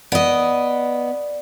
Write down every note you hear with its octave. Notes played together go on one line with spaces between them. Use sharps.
B3 D5 D#5